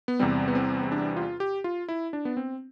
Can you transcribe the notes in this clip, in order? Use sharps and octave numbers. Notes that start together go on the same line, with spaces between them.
B3
E2 C3 G3 C4
B3
C4
C4
D4
F4
G4
F4
E4
D4
B3
C4